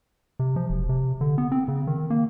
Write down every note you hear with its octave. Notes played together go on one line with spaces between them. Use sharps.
C3
F3
E1
C3
D3
B3
C4
C#3
D#3
A#3